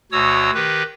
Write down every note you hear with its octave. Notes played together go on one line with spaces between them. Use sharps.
D2 B2 F#4 C#5 D#6 E6
D#3 G4 B4